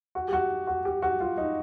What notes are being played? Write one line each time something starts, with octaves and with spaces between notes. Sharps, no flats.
F#4
G4
F#4
F#4
G4
F#4
F4
D#4